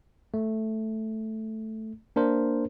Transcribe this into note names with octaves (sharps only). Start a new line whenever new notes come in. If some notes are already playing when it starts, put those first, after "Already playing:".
A3
A#3 D4 A#4 C5